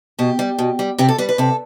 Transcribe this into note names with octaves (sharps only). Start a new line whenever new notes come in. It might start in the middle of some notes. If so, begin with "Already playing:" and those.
B2 G4
G3
B2
G3
C3 G4
A4
G3 B4
B4
C3 A4